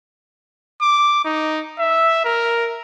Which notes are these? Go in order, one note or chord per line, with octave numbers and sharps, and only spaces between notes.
D6
D#4
E5
A#4